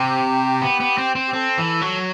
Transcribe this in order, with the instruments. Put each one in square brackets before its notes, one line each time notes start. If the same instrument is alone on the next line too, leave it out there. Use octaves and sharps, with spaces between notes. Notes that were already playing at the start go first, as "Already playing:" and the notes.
Already playing: [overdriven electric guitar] C3 [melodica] G4
[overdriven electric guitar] B3
B3
C4
C4
[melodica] G4
[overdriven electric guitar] C4 [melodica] A4
[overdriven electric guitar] E3
F#3